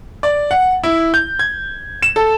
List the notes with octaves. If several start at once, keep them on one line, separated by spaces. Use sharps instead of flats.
D5
F#5
E4
G6
G#6
E7
A4